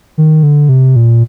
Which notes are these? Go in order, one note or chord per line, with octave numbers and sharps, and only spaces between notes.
D#3
D3
C3
A#2